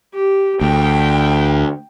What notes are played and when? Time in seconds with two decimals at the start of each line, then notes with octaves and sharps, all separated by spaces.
0.15 G4
0.61 D2 G5